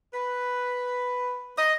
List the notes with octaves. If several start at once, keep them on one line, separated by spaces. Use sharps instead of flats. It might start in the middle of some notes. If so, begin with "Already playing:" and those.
B4
D#5